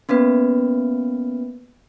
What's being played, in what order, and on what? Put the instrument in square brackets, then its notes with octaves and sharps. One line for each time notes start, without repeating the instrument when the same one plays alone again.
[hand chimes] A#3 B3 C#4 B4